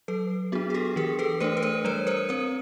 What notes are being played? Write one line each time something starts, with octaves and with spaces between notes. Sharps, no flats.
F#3 A4 B4
B3 D4 F#4 G#4
G#4
G4 A4
E3 G#4 A#4
A4 B4
A3 D4 A#4 C5
B4
A#4 C5
G3 B4 C#5
A#4 C5
C4 A#4 C5